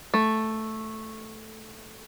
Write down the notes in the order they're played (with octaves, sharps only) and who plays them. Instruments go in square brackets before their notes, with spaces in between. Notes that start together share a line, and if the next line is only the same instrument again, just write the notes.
[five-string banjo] A3